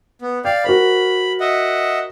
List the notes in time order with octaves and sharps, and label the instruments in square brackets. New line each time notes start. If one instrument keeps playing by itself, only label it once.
[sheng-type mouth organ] B3
[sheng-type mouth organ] D5 F5 [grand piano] G5
[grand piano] F#4 A#4 C5 [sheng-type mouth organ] B5
[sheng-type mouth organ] D#5 E5 F#5